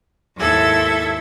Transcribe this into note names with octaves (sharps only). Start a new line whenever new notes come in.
D#2 G#2 E4 A4 E5 G#6